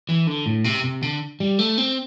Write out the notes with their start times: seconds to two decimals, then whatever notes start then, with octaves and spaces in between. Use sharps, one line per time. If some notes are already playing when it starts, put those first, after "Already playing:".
0.09 E3
0.28 D3
0.47 A2
0.65 C3
0.84 C3
1.02 D3
1.40 G3
1.59 A3
1.78 C4